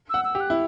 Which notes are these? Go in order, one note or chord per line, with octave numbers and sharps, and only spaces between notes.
F#5 E6
E6
G4
F#6
E4